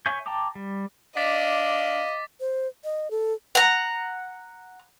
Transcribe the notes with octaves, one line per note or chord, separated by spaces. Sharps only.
C#5 E5 G#5 C#6 G6
G5 A5 A#5 D6
G3
D4 D#5 F5 D6 A6 B6
C5
D#5
A4
F#5 A#5